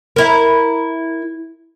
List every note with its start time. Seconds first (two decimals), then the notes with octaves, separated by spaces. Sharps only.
0.16 E4 A#4